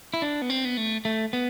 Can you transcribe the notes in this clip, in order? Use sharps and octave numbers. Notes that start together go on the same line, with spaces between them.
E4
D4
B3
C4
B3
A3
A3
B3